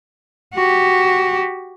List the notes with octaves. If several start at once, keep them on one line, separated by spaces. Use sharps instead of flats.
F#4 G4